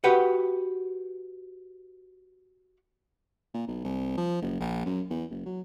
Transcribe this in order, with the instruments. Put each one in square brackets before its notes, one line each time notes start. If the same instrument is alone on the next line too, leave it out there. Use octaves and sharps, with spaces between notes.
[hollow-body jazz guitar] F#4 G4 B4 F#5
[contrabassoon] A#2
B1
C2
F3
F#1
A#1
F#2
E2
F#1
F#3